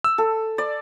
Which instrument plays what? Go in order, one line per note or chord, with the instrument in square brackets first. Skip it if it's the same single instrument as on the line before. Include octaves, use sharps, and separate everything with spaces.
[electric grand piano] E6
[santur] A4
D5